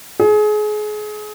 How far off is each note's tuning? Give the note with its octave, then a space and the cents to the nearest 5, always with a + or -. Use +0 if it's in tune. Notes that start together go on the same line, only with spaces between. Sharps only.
G#4 +30